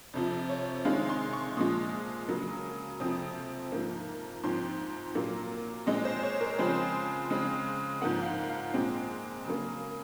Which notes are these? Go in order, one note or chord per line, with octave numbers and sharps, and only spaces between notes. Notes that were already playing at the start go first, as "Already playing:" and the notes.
F2 C3 F3
C#5
C3 D#3 G#3 F5
C6
C#6
A#2 F3 G#3 D#6
C#3 F#3 A#3
F2 C3 F3 C4 D#6
G#2 F3 A#3
G#2 F3 C4 C6
A#2 F#3 A#3
A#2 G#3 C4 D#5
C5
C#5
A#4
C#3 F3 G#3 C4 C5
C#3 G#3 C4
G#2 F3 A#3 F#5
F5
F#5
F5
A#2 G#3 C4
C#3 F#3 A#3